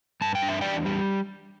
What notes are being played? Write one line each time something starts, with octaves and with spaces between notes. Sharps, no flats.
G2 A5
G5
D4
E5
E2 D5 G5
G3